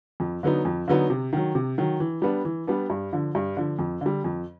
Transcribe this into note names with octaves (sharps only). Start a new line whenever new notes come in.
F2
D3 F#3 B3 D#4
F2
D3 F#3 B3 D#4
C3
D#3 F#3
C3
D#3 F#3
E3
G3 B3 D4
E3
G3 B3 D4
G2
D3 F3
G2
D3 F3
F2
D3 G3
F2